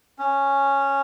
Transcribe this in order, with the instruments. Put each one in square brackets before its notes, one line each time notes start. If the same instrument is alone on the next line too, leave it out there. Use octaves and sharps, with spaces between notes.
[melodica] C#4